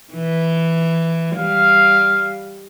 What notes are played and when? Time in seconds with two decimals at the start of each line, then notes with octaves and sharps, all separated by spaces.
0.14 E3
1.36 G3 F5